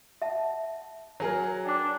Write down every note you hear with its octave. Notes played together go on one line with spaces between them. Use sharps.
E5 F#5 A5
F#3 G#4 A#4
D4 G5 D6